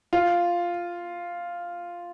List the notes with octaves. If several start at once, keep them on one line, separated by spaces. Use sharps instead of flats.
F4